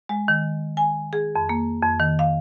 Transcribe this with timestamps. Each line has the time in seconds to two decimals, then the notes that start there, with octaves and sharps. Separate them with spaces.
0.09 G#3
0.28 D#3
0.77 G#5
1.13 G#4
1.36 F2
1.49 A#3
1.82 F2
2.00 D#3
2.19 F5